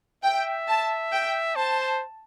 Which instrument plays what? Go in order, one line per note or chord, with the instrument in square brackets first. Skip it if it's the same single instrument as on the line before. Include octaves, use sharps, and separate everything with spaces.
[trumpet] E5 [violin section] G5
[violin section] A5
G5
[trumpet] C5 [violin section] A5